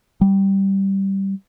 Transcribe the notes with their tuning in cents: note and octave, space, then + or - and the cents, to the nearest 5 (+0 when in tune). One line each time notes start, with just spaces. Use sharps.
G3 -10